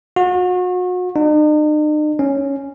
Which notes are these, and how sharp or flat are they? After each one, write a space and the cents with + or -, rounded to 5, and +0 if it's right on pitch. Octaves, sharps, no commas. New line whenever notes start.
F#4 -35
D#4 -45
C#4 +0